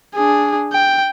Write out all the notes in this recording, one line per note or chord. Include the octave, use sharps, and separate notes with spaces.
D4 G#4
G5